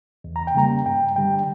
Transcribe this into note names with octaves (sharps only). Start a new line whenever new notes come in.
E2
A#5
G5
C#3 G3 A#3 A#5
G2 G5
D3 G3 G5